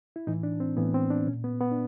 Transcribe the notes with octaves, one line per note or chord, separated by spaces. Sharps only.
E4
A2 E3 D#4
D4
C4
A2 E3 B3
C4
D4
A#2 C#4
B3
B3
D4